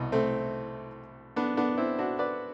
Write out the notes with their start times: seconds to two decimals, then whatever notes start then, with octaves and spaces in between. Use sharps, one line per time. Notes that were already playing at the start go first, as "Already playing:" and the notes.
Already playing: C2 B2
0.12 A3 C4
1.36 B3 D4
1.57 B3 D4
1.78 C4 E4
1.98 D4 F#4
2.19 B4 D5